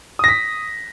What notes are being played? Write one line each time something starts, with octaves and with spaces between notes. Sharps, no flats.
D#6 A#6 B6